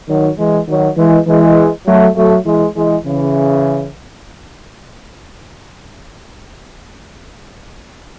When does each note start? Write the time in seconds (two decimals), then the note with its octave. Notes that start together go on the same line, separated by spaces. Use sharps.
0.09 D#3 F#3
0.38 E3 G#3
0.68 D#3 F#3
0.97 E3 G#3
1.27 E3 G#3
1.87 F#3 A3
2.16 F#3 A3
2.45 E3 G#3
2.76 E3 G#3
3.05 C#3 E3